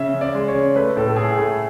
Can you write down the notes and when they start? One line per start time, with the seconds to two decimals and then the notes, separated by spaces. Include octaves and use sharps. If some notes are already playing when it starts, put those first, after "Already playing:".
Already playing: C#3 E5
0.14 C#3
0.21 D5
0.35 G#3
0.48 C#5
0.55 C#3
0.76 A3 B4
0.97 A2 A4
1.07 A4
1.16 A2 G#4
1.38 A3